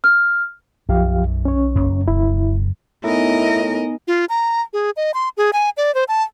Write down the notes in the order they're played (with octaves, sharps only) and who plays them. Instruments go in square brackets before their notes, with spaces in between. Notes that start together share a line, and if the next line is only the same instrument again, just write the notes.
[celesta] F6
[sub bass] B1 [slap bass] F#2 [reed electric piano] F3 G4 F5
[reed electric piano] C#4 C#5
[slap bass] F#1 F#2 A#3
[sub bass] E1 [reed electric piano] E4
[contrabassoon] A2 [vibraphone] B3 D#4 G#5 [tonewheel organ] E4 [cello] A#4 D#5
[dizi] F4
A#5
G#4
D#5
C6
G#4
G#5
D5
C5
A5